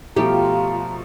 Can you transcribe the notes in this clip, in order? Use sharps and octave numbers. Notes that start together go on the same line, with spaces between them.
B2 F3 A3 F4 G4 A#5